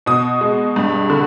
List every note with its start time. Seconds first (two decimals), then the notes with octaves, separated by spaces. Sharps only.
0.06 B2 D#6
0.41 G#3
0.76 G2
1.10 D3